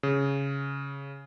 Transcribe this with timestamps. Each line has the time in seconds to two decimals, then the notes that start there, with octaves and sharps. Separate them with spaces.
0.03 C#3